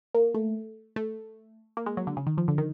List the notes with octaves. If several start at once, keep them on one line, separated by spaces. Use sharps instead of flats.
A#3
A3
A3
A#3
G#3
F#3
D3
C#3
D#3
F3
D3
D#3